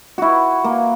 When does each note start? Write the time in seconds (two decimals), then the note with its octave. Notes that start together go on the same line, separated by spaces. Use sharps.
0.18 E4 F#4
0.64 A#3